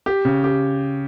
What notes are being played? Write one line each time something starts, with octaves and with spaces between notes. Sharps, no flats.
G4
C#3
G4